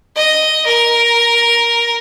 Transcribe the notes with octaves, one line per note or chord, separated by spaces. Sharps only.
D#5
A#4